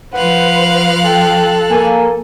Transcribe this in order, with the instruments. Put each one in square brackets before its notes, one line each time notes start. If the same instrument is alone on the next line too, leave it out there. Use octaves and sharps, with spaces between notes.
[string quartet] F3 F5 F#6 [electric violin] B4 C5 [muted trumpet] F#5
[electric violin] A4 [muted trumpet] G5
[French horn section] A#3 [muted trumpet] G#5